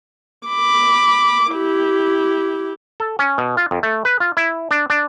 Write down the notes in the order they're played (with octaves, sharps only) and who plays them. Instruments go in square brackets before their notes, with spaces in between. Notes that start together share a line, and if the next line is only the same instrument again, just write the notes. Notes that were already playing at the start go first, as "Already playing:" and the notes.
[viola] B5 D6
E4 G4
[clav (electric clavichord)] A4
C#4
B2
F4
F2
A3
B4
F4
E4
D4
D4